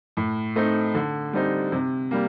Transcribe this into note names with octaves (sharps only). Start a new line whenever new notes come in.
A2
A3 C4 D#4
D3
G3 C4 D#4
C3
G3 A#3